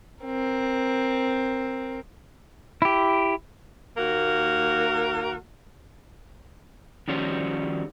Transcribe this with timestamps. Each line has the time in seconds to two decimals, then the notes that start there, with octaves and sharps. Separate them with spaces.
0.25 C4 A#4
2.82 E4 G4
3.97 D#2 A#3 F#4 A#4
7.08 D#3 F3 G3 C#4 F#4 C5